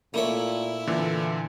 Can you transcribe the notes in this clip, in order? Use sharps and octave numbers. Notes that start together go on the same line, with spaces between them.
A#2 A3 A#3 E4 C#5
A#2 D3 E3